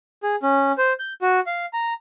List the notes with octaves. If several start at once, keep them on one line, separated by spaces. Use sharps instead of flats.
G#4
C#4
C5
G6
F#4
F5
A#5